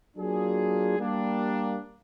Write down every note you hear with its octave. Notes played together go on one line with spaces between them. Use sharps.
F#3 A#3 D4 F4 G#4
G3 A#3 D4